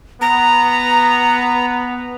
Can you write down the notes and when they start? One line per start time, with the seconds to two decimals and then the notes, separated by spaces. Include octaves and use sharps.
0.21 B3 A#5